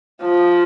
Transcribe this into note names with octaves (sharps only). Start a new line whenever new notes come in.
F3